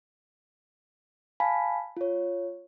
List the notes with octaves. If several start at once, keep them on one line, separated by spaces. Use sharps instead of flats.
F5 G#5 A5 B5 B6
F4 C#5